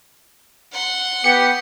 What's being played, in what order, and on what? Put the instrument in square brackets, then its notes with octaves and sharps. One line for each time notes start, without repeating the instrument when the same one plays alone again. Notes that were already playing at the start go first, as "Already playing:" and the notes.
[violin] F#5 C6
[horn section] B3 G4 [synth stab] C#7